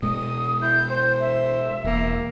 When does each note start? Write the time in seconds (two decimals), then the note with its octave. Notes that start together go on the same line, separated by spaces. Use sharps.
0.03 B2 G#3 D#6
0.61 E4 G6
0.90 C5
1.20 E5
1.84 E1 A#3